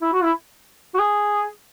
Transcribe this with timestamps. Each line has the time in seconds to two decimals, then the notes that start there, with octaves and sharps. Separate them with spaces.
0.02 E4
0.13 F#4
0.23 E4
0.94 F#4
0.99 G#4